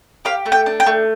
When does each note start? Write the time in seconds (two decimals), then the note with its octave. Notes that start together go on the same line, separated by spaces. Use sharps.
0.25 G4 F5
0.46 A3
0.52 G5
0.66 D4
0.80 G5
0.86 A3